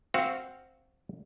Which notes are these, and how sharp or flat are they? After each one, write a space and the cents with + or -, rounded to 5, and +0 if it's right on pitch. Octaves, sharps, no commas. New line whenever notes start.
C4 +0 F#4 +0 F5 -20